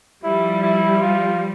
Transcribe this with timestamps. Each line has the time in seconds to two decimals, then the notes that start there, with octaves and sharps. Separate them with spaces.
0.24 F3 G3 E4
0.62 E4
1.01 F4